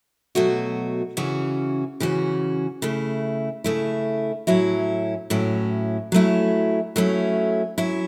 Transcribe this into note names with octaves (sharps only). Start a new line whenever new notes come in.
B2 F#3 A3 F#4
C#3 E3 C#4 F#4
C#3 E3 C#4 F#4
C#3 A3 E4
C#3 A3 E4
A2 F#3 C#4 E4
A2 F#3 C#4 E4
F#3 A3 C#4 E4
F#3 A3 C#4 E4
F#3 C#4 E4